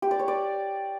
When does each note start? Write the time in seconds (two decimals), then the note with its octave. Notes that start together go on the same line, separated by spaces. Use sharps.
0.02 G4
0.11 D5
0.19 C#5
0.28 D5